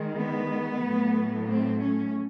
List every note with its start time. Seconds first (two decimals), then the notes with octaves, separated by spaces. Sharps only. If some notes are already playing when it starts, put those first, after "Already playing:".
Already playing: D#3 G#3
0.18 B3
0.84 A2 F#3 A3
1.50 C4
1.84 C#4